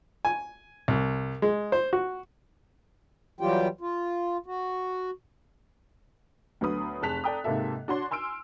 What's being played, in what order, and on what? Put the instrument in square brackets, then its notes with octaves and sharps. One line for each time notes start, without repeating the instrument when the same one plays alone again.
[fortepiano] G#5
C2
G#3
C5
F#4
[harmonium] E3 F#3 G3 F4 G4 G5
F4
F#4
[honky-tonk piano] D2 F#3 B3 B5 D#6
F1 G#4 A5 F#6 B6 F7
A4 D5 G5 A#5 D#6
G#2 C3 A#3 A4 E5
D4 F#4 C#5 C6
G#5 C6 E6 F6 D7